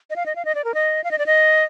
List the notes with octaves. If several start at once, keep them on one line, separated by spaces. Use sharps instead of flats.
D#5
F5
D#5
F5
D#5
D5
A#4
D#5
F5
D#5
D5
D#5